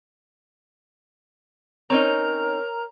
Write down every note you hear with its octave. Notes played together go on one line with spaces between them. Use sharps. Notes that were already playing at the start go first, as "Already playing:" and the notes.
C4 C#4 D#4 A#4 C#5 A#5